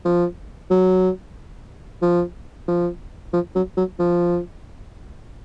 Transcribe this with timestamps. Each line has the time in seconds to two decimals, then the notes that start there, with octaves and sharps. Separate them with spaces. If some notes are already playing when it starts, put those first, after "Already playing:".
0.05 F3
0.70 F#3
2.02 F3
2.68 F3
3.33 F3
3.55 F#3
3.77 F#3
3.99 F3